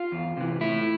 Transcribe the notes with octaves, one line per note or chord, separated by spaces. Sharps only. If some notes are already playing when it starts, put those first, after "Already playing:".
Already playing: F4
E2
C3 E3
A2 E4